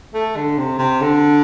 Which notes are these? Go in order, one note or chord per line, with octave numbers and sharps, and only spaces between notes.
A3
D3
C3
C3
D3